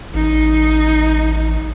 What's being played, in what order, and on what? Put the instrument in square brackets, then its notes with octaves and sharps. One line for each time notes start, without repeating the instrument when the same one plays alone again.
[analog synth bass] A1 [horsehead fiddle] D#4